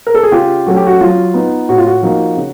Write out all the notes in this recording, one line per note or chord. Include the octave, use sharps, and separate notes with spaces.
A#4
A4
G#4
C#3 F4 G4
F#3 A3 C#4 F#4
G4
F#4
F#3 F4
B3 D#4
A2 F#4
F4
F#4
F3 A#3 D#4
C#3